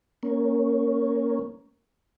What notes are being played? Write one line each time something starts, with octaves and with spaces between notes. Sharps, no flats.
A#3 C#4